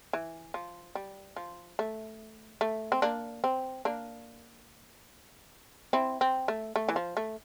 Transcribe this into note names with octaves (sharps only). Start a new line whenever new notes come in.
E3
F3
G3
F3
A3
A3
C4
A#3 D4
C4
A#3 D4
C4 E4
C4
A3
A3
E3
F3
A3